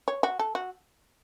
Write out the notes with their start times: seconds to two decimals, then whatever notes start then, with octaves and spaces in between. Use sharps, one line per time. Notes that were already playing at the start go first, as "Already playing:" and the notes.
0.08 C#5
0.23 F#4
0.39 A4
0.55 F#4